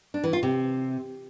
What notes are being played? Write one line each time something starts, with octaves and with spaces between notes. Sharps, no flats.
D4
E3
F4
C3